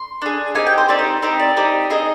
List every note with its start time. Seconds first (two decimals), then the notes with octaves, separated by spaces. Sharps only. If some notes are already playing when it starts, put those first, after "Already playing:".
Already playing: C6
0.22 D4 G#4
0.55 C4 D#4 G4 G#5
0.67 G5
0.78 C5
0.88 C4 D#4 G4 D5
0.99 C5
1.22 C4 D#4 G4 C5
1.40 D5
1.56 C4 D#4 G4
1.90 C4 D#4 G#4 D#5